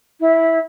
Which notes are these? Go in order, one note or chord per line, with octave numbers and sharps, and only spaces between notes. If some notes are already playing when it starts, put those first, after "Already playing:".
E4